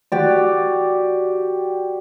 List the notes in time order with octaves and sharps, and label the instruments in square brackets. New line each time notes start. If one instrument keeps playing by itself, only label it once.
[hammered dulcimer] F#4 G4 D5